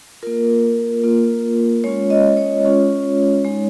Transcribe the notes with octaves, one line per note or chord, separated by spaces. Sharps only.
A#3 F4 A#4
A#3 F4
G#3 C#4 F4 C#5
D#5
C#5
G#3 C#4 F4
G#3 D#4